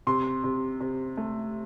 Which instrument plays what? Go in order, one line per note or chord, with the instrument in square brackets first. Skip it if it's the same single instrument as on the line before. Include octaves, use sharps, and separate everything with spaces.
[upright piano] C3 C6
C3
C3
A3